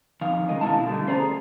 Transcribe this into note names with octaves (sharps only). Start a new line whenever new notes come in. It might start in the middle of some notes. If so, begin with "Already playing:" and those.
F2 D#3 F5
C#3 G#3 A#4 D#5
B2 D4 E4 F5 A5
D3 G3 A3
E2 C#4 C5 D5 A#5
G#4